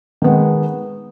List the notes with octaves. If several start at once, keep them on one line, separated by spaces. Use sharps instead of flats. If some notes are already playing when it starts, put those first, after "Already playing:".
D#3 G#3 B3